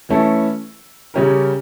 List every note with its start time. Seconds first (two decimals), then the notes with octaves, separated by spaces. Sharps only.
0.09 E3 A3 C#4 E4 A4
1.14 C#3 G3 C#4 G4 A#4